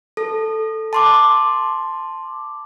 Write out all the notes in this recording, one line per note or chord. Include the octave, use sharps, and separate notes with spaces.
A4
A5 C6 D6